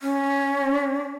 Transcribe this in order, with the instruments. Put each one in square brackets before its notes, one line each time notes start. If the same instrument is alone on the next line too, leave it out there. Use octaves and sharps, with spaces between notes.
[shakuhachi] C#4